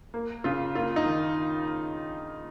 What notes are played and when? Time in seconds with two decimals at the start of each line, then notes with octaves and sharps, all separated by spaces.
0.14 A#3
0.44 C#3 F4
0.75 A#3 F4
0.96 D#4
1.06 D#3